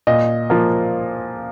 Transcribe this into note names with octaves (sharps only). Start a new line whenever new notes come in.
A#2 D#5
F3 A#3